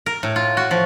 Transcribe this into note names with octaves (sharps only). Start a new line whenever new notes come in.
A#4
A2
F4
F#4
F3